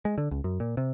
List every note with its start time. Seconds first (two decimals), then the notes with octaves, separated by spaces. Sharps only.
0.05 G#3
0.18 D3
0.31 C#2
0.44 F#2
0.60 A#2
0.77 C3